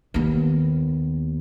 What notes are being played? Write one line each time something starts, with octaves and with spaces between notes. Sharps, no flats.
D#2 B3